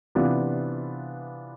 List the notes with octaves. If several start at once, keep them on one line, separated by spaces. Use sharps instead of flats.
C3 E3 B3 D4 F4